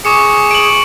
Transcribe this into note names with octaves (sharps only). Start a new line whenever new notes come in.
G#4 C#6 D6 C#7
D7 F#7